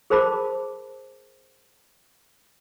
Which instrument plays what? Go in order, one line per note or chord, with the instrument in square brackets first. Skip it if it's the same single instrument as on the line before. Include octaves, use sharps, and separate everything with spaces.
[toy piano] G#4 A#4 C5 A5 B5 D6